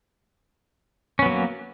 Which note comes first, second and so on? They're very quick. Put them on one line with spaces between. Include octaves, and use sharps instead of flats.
C#4 B3 F#3 A#3